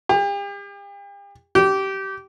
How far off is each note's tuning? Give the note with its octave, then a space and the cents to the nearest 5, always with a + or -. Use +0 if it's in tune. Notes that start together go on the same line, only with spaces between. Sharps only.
G4 +40
G4 -20